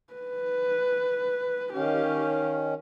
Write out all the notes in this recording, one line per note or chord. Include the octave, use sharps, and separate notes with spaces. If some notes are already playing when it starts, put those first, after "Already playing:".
B4
D#3 C#4 G4 F5